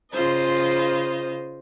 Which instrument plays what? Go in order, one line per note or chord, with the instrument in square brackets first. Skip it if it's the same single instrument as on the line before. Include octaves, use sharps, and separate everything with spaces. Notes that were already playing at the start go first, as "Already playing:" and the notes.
[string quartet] C#3 F4 C5 D#5